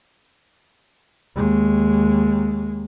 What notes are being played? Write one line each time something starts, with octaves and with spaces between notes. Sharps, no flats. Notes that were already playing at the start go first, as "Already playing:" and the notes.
D#2 G#3